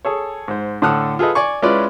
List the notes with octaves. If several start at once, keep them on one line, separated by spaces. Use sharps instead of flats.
G#4 A4 C#5
G#2 C5
A2 D3 A4 D#6 F6 F#6
F4 G#4 A4 B4 D#5
D5 G#5 C#6
G#3 C#4 E4 F4 B4 D5